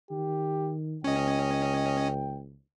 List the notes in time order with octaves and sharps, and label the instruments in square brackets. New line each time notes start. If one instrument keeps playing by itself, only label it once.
[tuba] D#3 [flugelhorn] G4
[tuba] C#2 [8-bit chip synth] C#4 D#5 [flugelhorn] G5